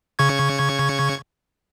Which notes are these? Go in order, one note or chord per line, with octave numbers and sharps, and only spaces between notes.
C#3 C#6 G#6